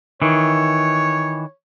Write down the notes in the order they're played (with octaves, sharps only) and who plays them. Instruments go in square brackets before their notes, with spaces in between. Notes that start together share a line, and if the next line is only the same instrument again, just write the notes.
[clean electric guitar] D#3 E3 [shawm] C#5